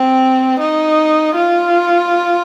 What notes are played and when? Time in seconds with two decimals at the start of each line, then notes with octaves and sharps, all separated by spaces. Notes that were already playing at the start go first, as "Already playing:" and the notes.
Already playing: C4
0.60 D#4
1.36 F4